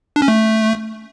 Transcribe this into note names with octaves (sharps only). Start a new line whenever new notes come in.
D4
C#4
A3